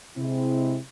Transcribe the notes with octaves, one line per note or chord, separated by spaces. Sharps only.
C3 G#3 C4 E4